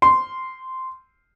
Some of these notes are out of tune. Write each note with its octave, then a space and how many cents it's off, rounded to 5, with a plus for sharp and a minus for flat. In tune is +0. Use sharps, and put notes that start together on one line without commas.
C6 -10